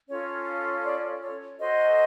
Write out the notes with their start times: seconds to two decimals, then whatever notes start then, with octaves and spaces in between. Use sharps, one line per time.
0.08 C#4 F4 A4 C#5
0.83 D5
1.21 C#5
1.58 F#4 A4 C5 D#5